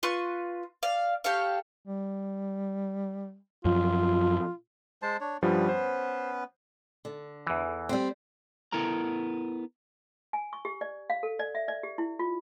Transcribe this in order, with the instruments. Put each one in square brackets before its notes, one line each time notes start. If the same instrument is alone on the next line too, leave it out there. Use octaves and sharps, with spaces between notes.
[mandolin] F4 B4 C6 C#6
D5 F5
G4 A4 C#5 F5
[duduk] G3
[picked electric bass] F#2 F3 [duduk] F4
[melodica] G#3 C5 A5
D4 C#5
[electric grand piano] G2 F3 G3 [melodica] B3 C#4 B4
[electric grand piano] C5
[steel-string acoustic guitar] D3
[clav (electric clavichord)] E2 E3
[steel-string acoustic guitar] G3 C4
[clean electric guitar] B3 E4 A4 A#4 A#5
[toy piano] G#5
C#6
G4
D5
F5
A4
D5
E5
D5
G4
E4
F4